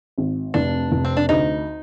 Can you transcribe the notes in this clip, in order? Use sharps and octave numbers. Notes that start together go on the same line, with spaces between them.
G#1
F1 D4
F1
C4
D4
D2 D#4